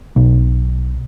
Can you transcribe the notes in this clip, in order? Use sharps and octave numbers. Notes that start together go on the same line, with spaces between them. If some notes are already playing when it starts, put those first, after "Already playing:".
B1